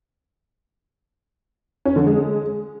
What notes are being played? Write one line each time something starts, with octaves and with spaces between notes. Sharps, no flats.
C#4
D3
G#3